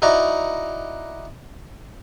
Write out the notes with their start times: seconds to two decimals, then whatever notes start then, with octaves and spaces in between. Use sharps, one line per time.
0.02 D#4 E4 F#4 D5 A#5